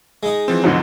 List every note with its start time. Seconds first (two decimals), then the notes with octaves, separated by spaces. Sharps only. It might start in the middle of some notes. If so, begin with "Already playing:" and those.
0.23 G#3 D#4
0.48 E3 F3 C4
0.64 D2 G#2 F#3